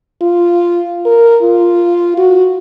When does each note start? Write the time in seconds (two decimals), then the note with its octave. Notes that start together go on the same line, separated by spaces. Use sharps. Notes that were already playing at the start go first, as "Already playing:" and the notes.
0.21 F4
1.06 A#4
1.42 F4
2.17 F#4